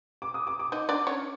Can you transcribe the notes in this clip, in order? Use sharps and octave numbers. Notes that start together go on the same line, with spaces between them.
D6
D#6
D6
D6
D#4 D#5
D4 D5
C#4 C#5